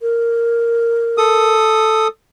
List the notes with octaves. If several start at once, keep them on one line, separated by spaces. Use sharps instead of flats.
A#4
A4 D#6